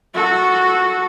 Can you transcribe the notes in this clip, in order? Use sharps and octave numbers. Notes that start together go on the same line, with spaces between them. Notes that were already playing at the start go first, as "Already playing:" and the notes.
F#4 A4